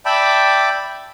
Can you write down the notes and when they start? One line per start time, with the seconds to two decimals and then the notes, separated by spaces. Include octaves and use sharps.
0.06 D5 E5 G5 A5 B5 D6